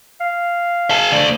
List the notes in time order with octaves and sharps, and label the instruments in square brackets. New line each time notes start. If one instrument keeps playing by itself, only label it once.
[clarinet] F5
[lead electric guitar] G#4 A5
D2 D5